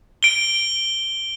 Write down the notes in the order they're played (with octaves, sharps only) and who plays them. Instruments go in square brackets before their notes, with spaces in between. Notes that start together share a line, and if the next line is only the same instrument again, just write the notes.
[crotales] D7 G7